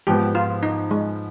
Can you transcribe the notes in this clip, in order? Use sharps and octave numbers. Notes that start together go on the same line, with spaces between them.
G#2 F3 B3 G4
F4
D#4
G#3